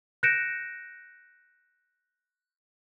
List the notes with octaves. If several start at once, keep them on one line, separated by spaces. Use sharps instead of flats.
F#6 G6 A#6 C#7 D7 E7